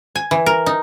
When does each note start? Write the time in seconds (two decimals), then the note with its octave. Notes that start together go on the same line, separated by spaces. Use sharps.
0.15 G#5
0.31 E3
0.46 A#4
0.66 D#4